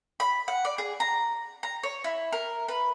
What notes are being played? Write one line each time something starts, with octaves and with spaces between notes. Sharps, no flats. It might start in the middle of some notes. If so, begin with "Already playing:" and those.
B5
F#5
D5
G#4
A#5
A#5
C#5
E4
A#4
B4